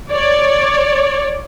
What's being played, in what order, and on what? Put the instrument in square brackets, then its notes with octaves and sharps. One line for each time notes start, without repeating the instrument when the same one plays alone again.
[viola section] C#5 D5